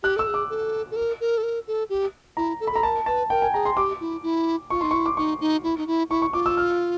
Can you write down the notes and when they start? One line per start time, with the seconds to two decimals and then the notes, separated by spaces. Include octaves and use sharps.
0.03 G4 F#6
0.16 A4 E6
0.27 G#4
0.34 D6
0.50 A4
0.91 A4
0.96 A#4
1.21 A#4
1.37 A4
1.43 A#4
1.67 A4
1.90 G4
2.37 E4 A#5
2.60 A4
2.67 B5
2.72 A4 A#5
2.83 A#4 A5
3.06 B4 A5
3.30 A#4 G5
3.42 G#5
3.54 G#4 A#5
3.65 C6
3.77 G4 D6
4.00 E4
4.23 E4
4.70 F4 C#6
4.81 D#4 C6
4.91 E4 C#6
5.06 D6
5.17 D#4 C#6
5.41 D#4
5.63 E4
5.77 D#4
5.87 E4
6.10 E4 C#6
6.22 C#6
6.33 F4 D6
6.46 E6
6.57 F6